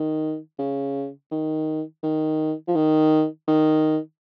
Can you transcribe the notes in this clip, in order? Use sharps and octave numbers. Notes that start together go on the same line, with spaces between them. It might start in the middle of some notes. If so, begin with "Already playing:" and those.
Already playing: D#3
C#3
D#3
D#3
F3
D#3
D#3